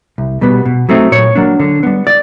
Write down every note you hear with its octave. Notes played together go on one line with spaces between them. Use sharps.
C2
B2 G3 B3
B2
F#3 A3 C4 D#4
A#2 C#5
F#3 A#3 D4
D3
G3 B3
D5